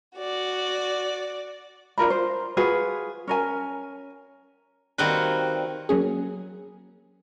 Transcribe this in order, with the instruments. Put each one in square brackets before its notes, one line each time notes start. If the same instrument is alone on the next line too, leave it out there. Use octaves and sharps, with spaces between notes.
[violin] F#4 D5
[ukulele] D4 F4 A#4 B5
C5
F4 F#4 G#4 B4
C#4 A#4 G#5
[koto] D#3 G3 A#3 C4 F#4 B4
[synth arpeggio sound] F#3 A#3 C#4 G#4